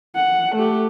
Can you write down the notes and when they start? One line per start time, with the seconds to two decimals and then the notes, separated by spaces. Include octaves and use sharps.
0.16 F#5
0.55 A3 G4